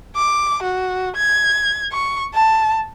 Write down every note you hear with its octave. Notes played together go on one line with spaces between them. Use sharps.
D6
F#4
G#6
C#6
A5